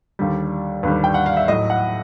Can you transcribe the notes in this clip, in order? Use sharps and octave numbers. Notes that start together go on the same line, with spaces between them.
D#2 D3 G3
D#2 D3 G3 B4
G5
F#5
F5
E5
A2 F#3 D#5
F#5